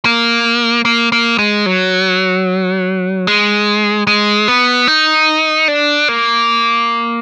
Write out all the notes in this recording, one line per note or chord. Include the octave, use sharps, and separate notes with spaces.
A#3
A#3
A#3
G#3
F#3
G#3
G#3
B3
D#4
D4
A#3